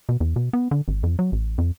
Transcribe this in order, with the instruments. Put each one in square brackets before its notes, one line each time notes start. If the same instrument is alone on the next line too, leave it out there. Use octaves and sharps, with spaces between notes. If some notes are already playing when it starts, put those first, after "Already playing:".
[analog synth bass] B2
E2
B2
B3
D3
G#1
F2
F#3
A1
F2